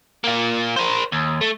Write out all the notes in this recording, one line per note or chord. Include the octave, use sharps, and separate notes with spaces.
A#3 F4
A#4 C5
D#2
A3